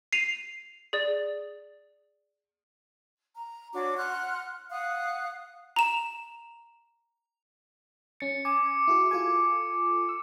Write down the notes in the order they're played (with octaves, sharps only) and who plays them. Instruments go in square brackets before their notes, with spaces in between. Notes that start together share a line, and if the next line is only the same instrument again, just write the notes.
[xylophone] C7 D#7 F7
G#4 D5
[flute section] A#5
D4 F#4 C#5 D6
F#5 C6 F6 F#6
F5 F#5 D#6 F#6
[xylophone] A#5 E7
[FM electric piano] C#4 A6 [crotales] C#7
[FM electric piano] G#5 [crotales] D6
[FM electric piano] E4 F#4 G#4
F4 A4 G#5
E6